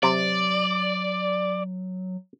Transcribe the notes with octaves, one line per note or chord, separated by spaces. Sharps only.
C3 F#3 D5